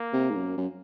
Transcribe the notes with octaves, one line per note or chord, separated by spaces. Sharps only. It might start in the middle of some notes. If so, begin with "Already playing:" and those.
Already playing: A#3
C3
G#2
F#2
F#2